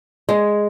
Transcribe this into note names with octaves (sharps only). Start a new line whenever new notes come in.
G#3